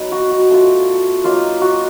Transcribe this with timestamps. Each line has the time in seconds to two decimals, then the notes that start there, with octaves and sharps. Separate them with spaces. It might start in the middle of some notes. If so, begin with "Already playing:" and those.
Already playing: F#3 B3 D#4
0.12 F#4
0.31 F#4
0.50 A3 D4 F4
1.24 F#3 A#3 D#4 F4
1.61 F#4